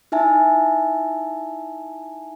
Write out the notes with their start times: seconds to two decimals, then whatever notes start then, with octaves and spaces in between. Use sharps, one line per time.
0.12 D#4 E4 E5 G#5 A5